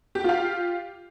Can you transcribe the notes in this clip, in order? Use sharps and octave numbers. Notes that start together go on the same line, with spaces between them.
F4 G4 F5 G5